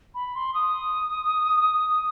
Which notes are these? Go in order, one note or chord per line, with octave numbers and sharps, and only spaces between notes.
B5
C6
D#6